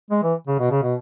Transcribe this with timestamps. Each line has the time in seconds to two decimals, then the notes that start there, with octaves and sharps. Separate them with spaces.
0.11 G#3
0.23 E3
0.47 C#3
0.59 B2
0.71 C#3
0.83 B2